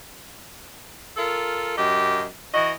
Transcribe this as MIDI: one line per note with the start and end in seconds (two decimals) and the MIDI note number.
1.17 1.77 65
1.17 1.77 69
1.17 1.77 70
1.77 2.23 42
1.77 2.23 67
1.77 2.23 75
2.53 2.71 52
2.53 2.71 66
2.53 2.71 75